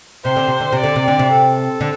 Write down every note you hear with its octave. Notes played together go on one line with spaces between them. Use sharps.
C3 C5
D3
C3
D3
C3
D3 D5
C3
D3
C3
A4
D3